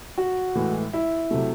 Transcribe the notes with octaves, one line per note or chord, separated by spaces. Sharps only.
F#4
A2 E3 G#3
E4
C3 F#3 A3